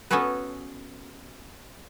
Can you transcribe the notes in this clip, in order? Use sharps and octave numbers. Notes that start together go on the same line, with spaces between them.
B3 C#4 F#4 G#4 A4 B4